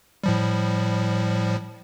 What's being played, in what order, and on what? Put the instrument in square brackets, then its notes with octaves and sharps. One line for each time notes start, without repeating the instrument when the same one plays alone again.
[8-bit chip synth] A2 F3 G3